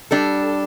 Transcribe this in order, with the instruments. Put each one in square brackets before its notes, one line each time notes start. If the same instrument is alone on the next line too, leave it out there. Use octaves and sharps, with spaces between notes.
[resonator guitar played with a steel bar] G3 D4 A4